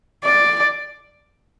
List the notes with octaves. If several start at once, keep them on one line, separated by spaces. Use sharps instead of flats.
D5